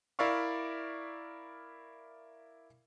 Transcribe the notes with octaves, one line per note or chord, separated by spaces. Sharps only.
E4 A#4 D5 E5 F5 C#6